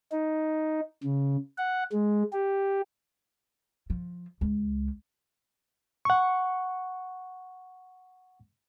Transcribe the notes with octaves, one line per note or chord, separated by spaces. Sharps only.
D#4
C#3
F#5
G#3
G4
F3
C#2
F#5 C#6